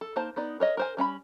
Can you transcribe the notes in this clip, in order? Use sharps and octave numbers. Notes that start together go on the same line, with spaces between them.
A4
A#3 D#4 C5 A5
B3 D#4 D5
A#4 C#5 D#5
A#4 C5 G#5
G3 C#4 F5 B5